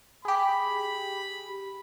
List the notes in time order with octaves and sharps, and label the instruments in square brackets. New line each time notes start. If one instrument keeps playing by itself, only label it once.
[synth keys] G4 G#4 [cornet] B5